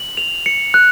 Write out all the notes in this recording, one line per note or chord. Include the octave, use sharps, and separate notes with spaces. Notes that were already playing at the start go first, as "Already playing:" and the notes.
Already playing: F#7
F7
C#7
F#6